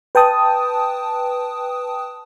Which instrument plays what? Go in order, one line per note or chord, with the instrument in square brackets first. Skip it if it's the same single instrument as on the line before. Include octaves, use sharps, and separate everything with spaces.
[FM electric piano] B4 G5 A5 D#6